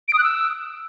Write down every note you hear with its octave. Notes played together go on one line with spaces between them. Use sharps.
D7
D#6
F#6
E6